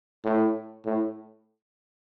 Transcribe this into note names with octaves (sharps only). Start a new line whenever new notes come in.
A2
A2